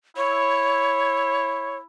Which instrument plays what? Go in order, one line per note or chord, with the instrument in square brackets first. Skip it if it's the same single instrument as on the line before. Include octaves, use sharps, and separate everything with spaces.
[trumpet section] E4 [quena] C#5